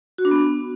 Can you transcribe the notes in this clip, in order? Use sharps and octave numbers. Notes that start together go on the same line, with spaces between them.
F#4
D4
B3